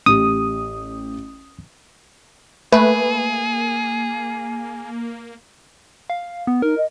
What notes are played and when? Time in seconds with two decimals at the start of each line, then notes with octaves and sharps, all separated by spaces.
0.06 A1 G4 D#6
2.72 A3 A#3 G#4 B4
6.10 F5
6.47 B3
6.62 D#4 A#4
6.77 D#5